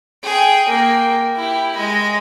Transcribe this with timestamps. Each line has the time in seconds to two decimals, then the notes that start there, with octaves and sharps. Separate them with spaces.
0.24 G#4 G5
0.69 A#3 G5
1.36 E4 G4
1.74 G#3 D#5